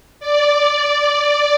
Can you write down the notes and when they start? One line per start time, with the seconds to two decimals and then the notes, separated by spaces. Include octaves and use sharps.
0.20 D5